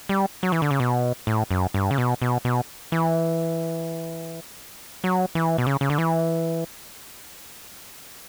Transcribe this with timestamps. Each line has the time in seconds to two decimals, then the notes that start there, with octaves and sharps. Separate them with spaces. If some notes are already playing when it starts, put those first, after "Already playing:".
0.09 G3
0.43 F#3
0.52 E3
0.62 D3
0.71 C#3
0.80 B2
1.27 A2
1.51 F#2
1.74 G2
1.91 C#3
1.98 B2
2.22 B2
2.45 B2
2.92 E3
5.04 F#3
5.35 E3
5.58 B2
5.67 C#3
5.81 C#3
5.90 D3
5.98 E3